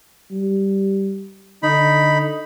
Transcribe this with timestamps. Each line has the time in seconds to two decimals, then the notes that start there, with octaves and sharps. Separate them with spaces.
0.31 G3
1.63 D3 D#4 B5